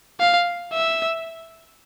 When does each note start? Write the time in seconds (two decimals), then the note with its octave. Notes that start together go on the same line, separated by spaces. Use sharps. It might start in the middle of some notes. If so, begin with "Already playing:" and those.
0.20 F5
0.73 E5